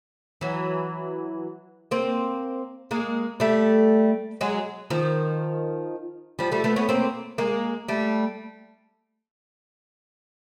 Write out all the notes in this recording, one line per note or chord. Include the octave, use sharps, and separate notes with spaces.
E3 F#3
A#3 C4
G#3 A#3
G3 A3
F#3 G#3
D#3 F3
F3 G3
G3 A3
A3 B3
B3 C#4
A#3 C4
G#3 A#3
G3 A3